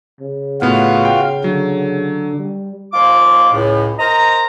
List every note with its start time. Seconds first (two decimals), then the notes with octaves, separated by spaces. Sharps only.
0.21 C#3
0.62 A2 B3 F4 F#4 F5
1.05 G5
1.44 D3 F#3
2.38 G3
2.93 D#2 F3 F4 C6 D6
3.53 C#2 A2
3.99 A#4 C5 D#5 A#5